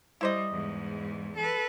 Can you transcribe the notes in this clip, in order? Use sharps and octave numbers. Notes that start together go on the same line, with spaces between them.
G3 E4 C5 D#5
E2 G#2
A4 B4